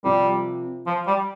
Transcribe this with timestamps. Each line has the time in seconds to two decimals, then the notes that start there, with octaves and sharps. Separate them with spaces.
0.03 C3 F3 G3 C4 F4 A#4
0.86 F3
1.07 G3